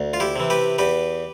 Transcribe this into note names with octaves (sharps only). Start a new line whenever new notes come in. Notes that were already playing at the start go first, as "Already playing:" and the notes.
Already playing: D2
F4
E4 G4
C3 E3
G4 B4
E2 G4 B4